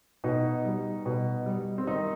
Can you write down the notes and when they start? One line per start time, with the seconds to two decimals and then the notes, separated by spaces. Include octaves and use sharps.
0.24 B2 D#4
0.65 G3
1.06 B2
1.46 G3
1.78 C4
1.87 D#3 D#4